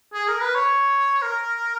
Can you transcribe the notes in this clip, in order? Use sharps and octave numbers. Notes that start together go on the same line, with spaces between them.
G#4
A#4
B4
C#5
A#4